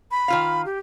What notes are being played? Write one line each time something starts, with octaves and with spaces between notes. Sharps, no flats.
B5
D#3 F4 F5
G4